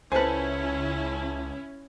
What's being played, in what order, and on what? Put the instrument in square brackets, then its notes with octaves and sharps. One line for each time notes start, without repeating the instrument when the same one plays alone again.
[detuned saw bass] C#2 [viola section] C#4 E4 [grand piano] A4 G#5 [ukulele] B4 C5